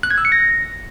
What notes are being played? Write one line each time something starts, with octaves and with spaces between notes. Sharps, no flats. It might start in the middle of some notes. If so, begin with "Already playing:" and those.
F#6
G#6
E6
C#7
A#6